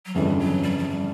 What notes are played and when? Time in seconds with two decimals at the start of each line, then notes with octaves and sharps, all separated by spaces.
0.06 F#3
0.15 G1 F2 C#3 E3 G3
0.39 F#3
0.63 G3
0.70 F#3
0.78 G3
0.84 F#3
0.88 G3